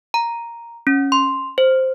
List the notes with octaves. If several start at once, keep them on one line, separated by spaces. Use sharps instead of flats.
A#5
C#4
C6
C5